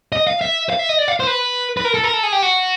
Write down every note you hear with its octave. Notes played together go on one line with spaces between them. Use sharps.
D#5
F5
E5
F5
E5
D#5
D5
F5
C5
B4
B4
A#4
A4
A#4
A4
G#4
G4
F#4